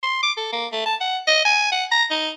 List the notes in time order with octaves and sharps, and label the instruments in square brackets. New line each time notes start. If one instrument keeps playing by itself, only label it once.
[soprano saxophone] C6
D6
A4
A#3
A3
A5
F#5
D#5
G#5
F#5
A#5
D#4